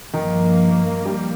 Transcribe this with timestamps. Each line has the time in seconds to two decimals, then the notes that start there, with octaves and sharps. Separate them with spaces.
0.13 G2 D#3 F3 A#3
1.05 G3